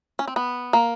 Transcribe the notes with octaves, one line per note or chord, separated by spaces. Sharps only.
C#4
C4
B3
A#3